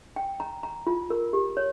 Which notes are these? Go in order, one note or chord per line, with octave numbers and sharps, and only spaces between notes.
G5
A#5
A#5
F4
A#4
G4
C#5